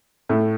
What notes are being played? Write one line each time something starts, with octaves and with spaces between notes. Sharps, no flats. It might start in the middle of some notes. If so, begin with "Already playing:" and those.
A2 A3